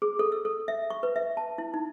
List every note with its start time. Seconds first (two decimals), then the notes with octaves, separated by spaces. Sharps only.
0.02 G#4
0.19 A4
0.32 E6
0.45 A4
0.68 E5
0.90 C#6
1.03 B4
1.16 E5
1.37 A5
1.58 E4
1.74 D#4